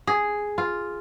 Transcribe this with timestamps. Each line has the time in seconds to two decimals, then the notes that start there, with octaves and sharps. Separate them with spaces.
0.07 G#4
0.58 F4